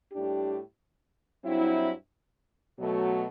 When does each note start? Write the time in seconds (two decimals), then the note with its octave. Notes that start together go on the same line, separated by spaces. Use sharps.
0.12 A2 G3 D4 G4
1.45 G2 F#3 C4 E4
2.78 B2 F#3 A3